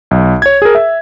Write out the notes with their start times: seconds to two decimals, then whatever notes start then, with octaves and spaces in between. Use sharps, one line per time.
0.11 B1
0.42 C#5 G#6
0.62 G#4 A#4
0.75 E5